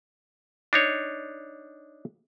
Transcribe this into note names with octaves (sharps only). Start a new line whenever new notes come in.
D4 D#4 C#5